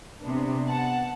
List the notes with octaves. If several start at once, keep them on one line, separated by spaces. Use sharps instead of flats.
C3 B3 D4
F#5 A5